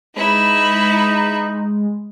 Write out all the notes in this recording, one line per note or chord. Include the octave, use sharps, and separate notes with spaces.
G#3 D#4 E4 B4